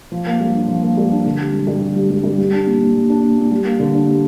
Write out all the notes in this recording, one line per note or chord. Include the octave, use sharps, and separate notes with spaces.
F3
A#3
G2
D4
F3
A#3
G2
D4
D3
G3
G2
G2
D3
G3
G2
G2
G3
D4
A#2
A#2
G3
D4
A#2
A#2
G3
A#3
D3
D4
G3